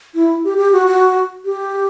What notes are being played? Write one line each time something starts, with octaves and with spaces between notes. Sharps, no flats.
E4
G4
G4
F#4
F#4
G4